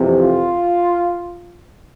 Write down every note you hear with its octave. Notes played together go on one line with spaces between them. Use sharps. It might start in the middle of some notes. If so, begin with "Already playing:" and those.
Already playing: F2 C3 E3
F4